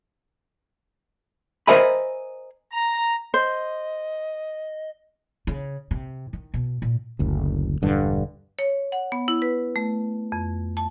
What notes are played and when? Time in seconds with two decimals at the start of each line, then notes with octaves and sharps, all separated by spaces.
1.67 A#4 C5 D#5 E5 G#5 B5
2.72 A#5
3.34 C5 D#5
5.47 C#3
5.91 C3
6.33 D#3
6.54 B2
6.82 A#2
7.19 F#1 D2
7.82 E1 G2 D3
8.59 C#5
8.92 F#5
9.12 B3
9.28 E4
9.42 B4
9.76 A3
10.32 F2
10.77 A5